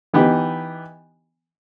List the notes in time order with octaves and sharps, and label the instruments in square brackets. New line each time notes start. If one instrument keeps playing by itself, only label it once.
[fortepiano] E3 B3 D#4 G4